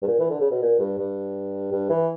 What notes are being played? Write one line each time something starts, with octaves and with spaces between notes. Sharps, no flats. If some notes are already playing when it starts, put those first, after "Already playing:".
G2
A#2
E3
D3
C#3
B2
A#2
G2
G2
G2
E3